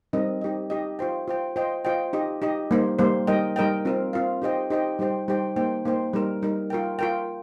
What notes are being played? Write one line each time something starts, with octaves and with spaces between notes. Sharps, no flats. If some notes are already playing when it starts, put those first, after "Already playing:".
G3 C4 D#4 A#4 D#5
D#4 G4 D#5
D#4 G4 D#5
F4 C5 G5
F4 C5 G5
F4 C5 D#5 G5
F4 C5 D#5 G5
D#4 G4 D#5
D#4 G4 D#5
G3 A#3 D#4 C5
G3 A#3 D#4 C5
G3 D#4 A#4 D#5 G5
G3 D#4 A#4 D#5 G5
C4 F4 A#4 F5
C4 F4 A#4 F5
D#4 G4 C5 D#5 G5
D#4 G4 C5 D#5 G5
G3 D#4 G4 C5 G5
G3 D#4 G4 C5 G5
A#3 D#4 C5 G5
A#3 D#4 C5 G5
G3 D#4 A#4
G3 D#4 A#4
F4 A#4 G5
F4 A#4 G5